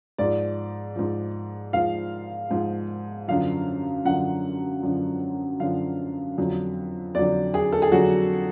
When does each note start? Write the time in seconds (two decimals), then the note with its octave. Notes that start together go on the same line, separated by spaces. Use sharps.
0.18 G#2 F3 D5
0.96 G#2 F3
1.73 G#2 F3 F5
2.51 G#2 F3
3.28 F#2 D3 F3 F5
4.05 F#2 D3 F3 F#5
4.83 F#2 D3 F3
5.60 F#2 D3 F3 F5
6.38 F2 D3 F#3
7.15 F2 D3 F#3 D5
7.54 G#4
7.73 A4
7.82 G#4
7.92 F2 D3 F#3 F#4